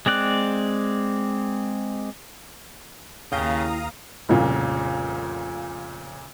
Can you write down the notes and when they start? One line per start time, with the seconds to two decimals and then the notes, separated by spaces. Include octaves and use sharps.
0.06 G#3 C4 D5 F#6
3.32 D#2 C#3 E4 F5 G5 A#5 D#6
4.29 F1 C2 F2 A#2 C#3